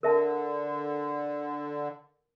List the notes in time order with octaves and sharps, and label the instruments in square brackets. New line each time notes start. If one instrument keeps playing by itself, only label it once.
[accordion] D3 [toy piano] A#4 E5 A5